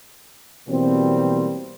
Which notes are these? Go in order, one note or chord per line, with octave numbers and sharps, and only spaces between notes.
B2 E3 F#3 G3 A#3 C4